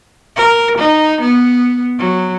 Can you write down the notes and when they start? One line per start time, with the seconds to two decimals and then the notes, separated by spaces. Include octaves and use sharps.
0.36 A#4
0.78 D#4
1.21 B3
1.99 F#3